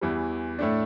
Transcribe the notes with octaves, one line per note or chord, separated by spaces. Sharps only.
E2 E3 G3
A2 A3 D4